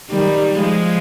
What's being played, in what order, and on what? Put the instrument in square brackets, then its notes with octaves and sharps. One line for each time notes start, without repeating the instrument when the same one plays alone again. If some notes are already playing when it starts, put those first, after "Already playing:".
[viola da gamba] D#3 G3
F3 G#3